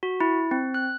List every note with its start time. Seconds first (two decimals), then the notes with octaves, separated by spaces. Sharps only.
0.03 F#4
0.20 E4
0.51 C4
0.74 F#6